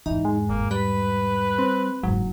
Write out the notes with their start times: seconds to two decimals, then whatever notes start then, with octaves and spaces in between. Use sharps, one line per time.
0.06 E2 G#2 E3 D#4
0.25 G#3
0.49 G1 A#3
0.71 G3 B4 B6
1.58 C4
2.03 F#1 G#2 F#3 D#4